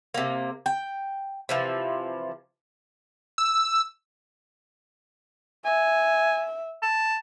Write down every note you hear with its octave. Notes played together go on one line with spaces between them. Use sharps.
C3 A#3
G5
C3 E3 F3
E6
E5 G#5
A5